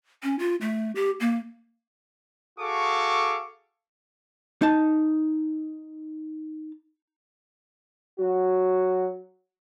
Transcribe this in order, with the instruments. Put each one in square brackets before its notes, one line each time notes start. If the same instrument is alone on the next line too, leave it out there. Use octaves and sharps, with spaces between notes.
[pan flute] C#4
F4
A3
G4
A#3
[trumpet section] F#4 G#4 A4 F5 C#6 D6
[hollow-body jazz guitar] D#4 A5
[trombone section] F#3 F#4